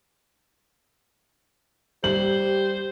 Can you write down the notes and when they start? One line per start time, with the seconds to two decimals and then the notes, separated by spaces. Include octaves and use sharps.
2.04 G3 G4 C5 F#7